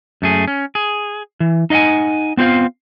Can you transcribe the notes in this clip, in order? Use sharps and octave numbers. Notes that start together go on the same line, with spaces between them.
F#2 A3 G#4
C#4
G#4
E3
D#4 D#5 F5 F#5 G#5
B3 C4 F4 C5 F5